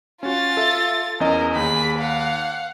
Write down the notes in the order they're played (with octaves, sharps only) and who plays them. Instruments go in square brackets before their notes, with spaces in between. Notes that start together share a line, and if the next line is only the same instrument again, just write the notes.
[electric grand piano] C#4 F#4 [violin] F4 A6
[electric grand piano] A4 E5
[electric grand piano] E2 C#4 D#5 [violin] A#4
[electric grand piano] D#2 [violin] G#4 B5
[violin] F5 F#5